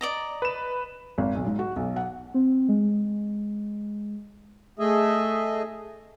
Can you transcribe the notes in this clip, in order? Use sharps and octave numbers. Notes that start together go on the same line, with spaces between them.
D5 D#5 A#5
B4 E7
G#1
B1
G#2
F#4
B1
F#5
C4
G#3
A3 G#4 D#5 E5